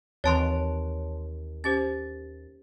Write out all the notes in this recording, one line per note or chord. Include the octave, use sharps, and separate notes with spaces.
D#2 E3 C4 C#5 A5 C6
C#4 G4 C5 A6